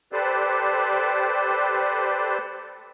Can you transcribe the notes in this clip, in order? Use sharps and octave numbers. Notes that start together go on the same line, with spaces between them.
G4 A4 B4 C5 D5